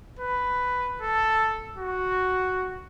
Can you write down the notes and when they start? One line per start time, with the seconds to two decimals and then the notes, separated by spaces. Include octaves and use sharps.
0.19 B4
1.02 A4
1.77 F#4